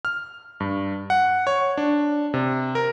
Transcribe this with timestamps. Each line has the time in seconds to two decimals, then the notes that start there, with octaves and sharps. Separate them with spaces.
0.05 F6
0.60 G2
1.10 F#5
1.47 C#5
1.77 D4
2.34 C3
2.75 A#4